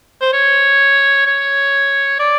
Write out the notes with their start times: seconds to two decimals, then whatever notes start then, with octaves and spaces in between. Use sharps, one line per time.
0.21 C5
0.33 C#5
1.26 C#5
2.20 D5